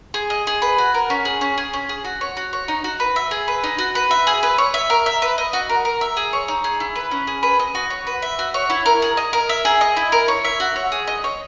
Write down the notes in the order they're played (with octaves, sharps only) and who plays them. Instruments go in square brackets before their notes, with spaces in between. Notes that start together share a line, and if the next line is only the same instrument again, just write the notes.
[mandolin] G#4
D#5
G#4
B4
F#4
A#4
C#4
G#4
C#4
G#4
C#4
G#4
F#4
C#5
F#4
C#5
D#4
F#4
B4
E5
G#4
B4
D#4
F#4
B4
E5
G#4
B4
C#5
E5
A#4
E5
B4
D#5
F#4
A#4
A#4
E5
G#4
C#5
D#4
G#4
E4
B4
C#4
G#4
B4
D#5
F#4
C#5
B4
E5
F#4
C#5
E4
A#4
G#4
D#5
A#4
E5
G#4
D#5
E4
A#4
C#5
E5
F#4
C#5
G#4
D#5
C#5